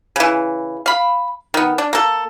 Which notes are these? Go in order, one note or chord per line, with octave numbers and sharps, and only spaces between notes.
C#3 E3
F5 B5
D#3 B3
D4
A#3 A4